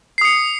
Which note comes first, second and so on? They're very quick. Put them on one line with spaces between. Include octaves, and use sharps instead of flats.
C7 D#6 C#7